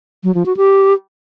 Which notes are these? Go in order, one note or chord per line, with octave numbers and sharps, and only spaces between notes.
F#3
F3
F#4
G4